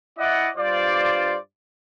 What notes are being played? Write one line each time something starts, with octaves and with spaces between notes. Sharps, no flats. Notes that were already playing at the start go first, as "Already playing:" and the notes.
E4 D5 D#5 F#5
G2 F4 C5 D5